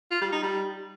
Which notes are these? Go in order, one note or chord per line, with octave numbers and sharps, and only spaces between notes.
F4
G3
D#4
G3